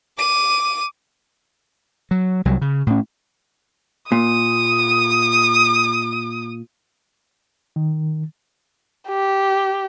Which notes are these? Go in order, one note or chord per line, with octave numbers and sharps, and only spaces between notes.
D6 D#7
F#3
C2 F#3 G3
C#3
A2 C#4
A#2 D#6
D#3
G4